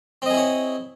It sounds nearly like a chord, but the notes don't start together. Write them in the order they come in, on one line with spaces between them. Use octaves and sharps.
C4 D#5 G#4 E4 C#5